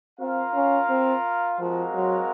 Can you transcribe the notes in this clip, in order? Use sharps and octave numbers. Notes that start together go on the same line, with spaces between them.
C4 F4 A#4 F5
C#4
C4
F3 G#3 C4 F#4 A#4 F5
F#3